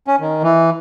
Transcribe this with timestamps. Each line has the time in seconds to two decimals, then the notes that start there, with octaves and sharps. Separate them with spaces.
0.07 C#4
0.20 D#3
0.43 E3